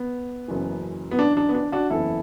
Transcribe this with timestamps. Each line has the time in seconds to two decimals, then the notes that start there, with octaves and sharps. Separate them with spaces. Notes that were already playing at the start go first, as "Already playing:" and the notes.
Already playing: B3
0.48 F#1 F#2 E3
1.11 B3
1.19 D4
1.37 D4
1.49 B3
1.55 D4
1.72 D4 F#4
1.90 F#1 E2 E3 E4 A4